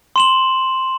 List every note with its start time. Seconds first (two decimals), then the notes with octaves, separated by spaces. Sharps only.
0.16 C6 E7 F#7